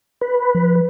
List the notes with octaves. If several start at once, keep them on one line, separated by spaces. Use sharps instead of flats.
B4
F3